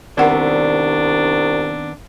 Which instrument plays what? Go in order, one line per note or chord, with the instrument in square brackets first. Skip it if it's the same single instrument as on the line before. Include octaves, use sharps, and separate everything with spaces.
[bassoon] C2 [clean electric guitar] D#3 B3 C4 [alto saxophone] D4 [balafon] A#4 F#5